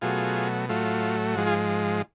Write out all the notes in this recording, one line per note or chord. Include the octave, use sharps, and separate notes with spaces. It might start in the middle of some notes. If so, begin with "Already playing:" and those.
B2 F#3 A3 F4 G#4
A2 F#3 A3 F4
G#2 F3 G#3 F#4
F4 G#4